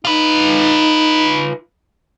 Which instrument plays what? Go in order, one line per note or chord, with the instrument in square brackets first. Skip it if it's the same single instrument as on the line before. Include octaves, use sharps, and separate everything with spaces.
[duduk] D#4 [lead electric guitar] F4 B4